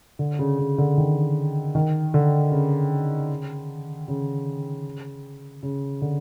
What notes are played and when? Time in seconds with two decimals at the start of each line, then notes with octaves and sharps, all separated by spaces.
0.19 D3
0.39 C#3
0.59 C#3
0.78 D3
0.97 D#3
1.75 D#3
2.14 D3
2.52 C#3
4.08 C#3
5.63 C#3
6.02 D3